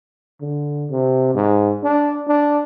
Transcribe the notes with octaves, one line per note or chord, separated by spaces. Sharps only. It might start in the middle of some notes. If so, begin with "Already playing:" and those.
D3
C3
G#2
D4
D4